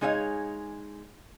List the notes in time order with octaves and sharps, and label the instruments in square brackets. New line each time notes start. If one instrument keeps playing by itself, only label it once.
[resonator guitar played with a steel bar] G#3 D#4 G#4 C#5 E5 F5